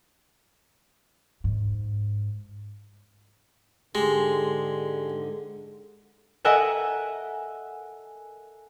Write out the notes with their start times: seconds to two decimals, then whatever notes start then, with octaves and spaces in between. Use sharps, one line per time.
1.44 G#2
3.95 G#2 D3 G#3 G4 C6 A#6
6.45 A4 A#4 D#5 E5 F#5 G#5